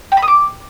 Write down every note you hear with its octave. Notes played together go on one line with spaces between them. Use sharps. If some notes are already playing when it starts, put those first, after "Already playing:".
G5
B5
D#6
D6